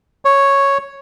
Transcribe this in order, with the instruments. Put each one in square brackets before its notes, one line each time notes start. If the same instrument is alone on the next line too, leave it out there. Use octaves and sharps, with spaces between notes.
[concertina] C#5